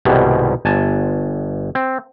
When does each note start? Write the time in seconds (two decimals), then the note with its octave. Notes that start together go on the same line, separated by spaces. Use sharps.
0.05 C2 G#2 B2 D#3 G3
0.65 G1 G#5 A5
1.75 C4